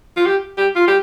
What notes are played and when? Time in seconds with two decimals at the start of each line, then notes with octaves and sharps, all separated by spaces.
0.17 F4
0.26 G4
0.58 G4
0.76 F4
0.88 G4